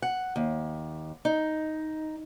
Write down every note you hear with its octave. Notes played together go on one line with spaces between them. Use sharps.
F#5
D#2
D#4